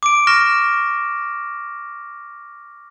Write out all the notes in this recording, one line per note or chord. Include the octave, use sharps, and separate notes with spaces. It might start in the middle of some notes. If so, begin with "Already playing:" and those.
D6 D7
C#6 F6 A#6 E7